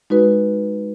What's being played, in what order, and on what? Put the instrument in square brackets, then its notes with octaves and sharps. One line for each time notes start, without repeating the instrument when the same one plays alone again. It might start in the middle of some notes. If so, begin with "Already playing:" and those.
[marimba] G#3 D#4 F#4 B4